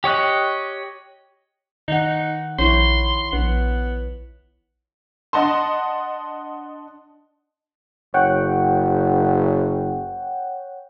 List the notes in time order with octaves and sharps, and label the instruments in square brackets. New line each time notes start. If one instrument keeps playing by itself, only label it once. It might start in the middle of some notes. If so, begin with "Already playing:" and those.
[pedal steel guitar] G4 C#5 D#5 F#6
[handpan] D#3 F#5 [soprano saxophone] D#4
[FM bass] A#1 [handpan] E4 C#5 [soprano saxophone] C6
[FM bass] A#1 [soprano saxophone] B3
[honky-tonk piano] D4 D#5 F#5 A5 C6
[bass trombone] F#1 [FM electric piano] C#5 F#5 G5